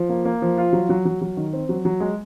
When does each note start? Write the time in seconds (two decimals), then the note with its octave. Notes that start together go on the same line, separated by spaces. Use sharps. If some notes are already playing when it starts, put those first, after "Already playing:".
Already playing: F3
0.09 A#3
0.25 A#3
0.42 F3
0.57 F4
0.73 F#3
0.89 F#3
1.05 F#3
1.21 F#3
1.37 D#3
1.53 C4
1.69 F#3
1.85 F#3
2.00 G#3